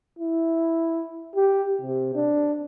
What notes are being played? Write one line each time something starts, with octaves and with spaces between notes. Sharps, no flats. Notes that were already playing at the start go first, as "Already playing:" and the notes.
E4
G4
C3
D4